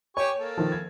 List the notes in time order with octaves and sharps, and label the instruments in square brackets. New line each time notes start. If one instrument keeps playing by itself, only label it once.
[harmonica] G4 G#5 C#6 [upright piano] C#5
[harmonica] A#3 A4
[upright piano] D#3 F3
G#6